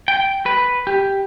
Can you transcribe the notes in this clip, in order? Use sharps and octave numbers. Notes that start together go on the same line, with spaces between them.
G5
B4
G4